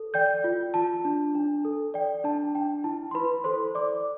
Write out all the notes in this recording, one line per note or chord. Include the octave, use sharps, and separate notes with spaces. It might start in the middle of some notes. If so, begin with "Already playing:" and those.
Already playing: A4
D5 G5 G6
F4
F4 A5
D4
D4
A4
D5 G5
D4 A5
D4 G5
E4 A5
C6
E4 B4 B5
A4 C5 C6
D5 D6